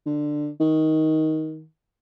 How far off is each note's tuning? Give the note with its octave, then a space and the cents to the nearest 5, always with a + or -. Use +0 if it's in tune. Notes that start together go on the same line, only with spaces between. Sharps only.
D3 +15
D#3 +15